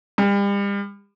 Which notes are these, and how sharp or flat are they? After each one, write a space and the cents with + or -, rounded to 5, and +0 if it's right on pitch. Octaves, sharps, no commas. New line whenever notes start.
G3 +40